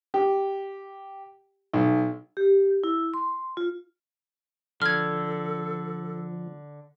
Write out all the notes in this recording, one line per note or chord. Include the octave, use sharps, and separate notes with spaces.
G4
B1
G4
E4
C6
F4
D3 F3 A4 F6 G#6